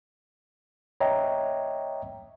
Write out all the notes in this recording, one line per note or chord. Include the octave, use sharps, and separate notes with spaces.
C#5 D#5 E5 G5 A#5